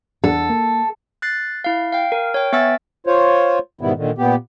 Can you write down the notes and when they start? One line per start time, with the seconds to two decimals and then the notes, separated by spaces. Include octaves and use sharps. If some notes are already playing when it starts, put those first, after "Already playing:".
0.24 E2 D4 A4 F#5
0.50 A#3
1.22 F#6 A6 C7
1.64 E4 F5
1.92 F5 G5
2.12 A#4
2.34 C#5 G5
2.53 B3 E5 G#5 E6 A6
3.07 F4 C5 C#5
3.81 G#2 B2 D#3 G3 B3 E4
3.97 A#2 D3 D#3
4.18 A#2 B3 G4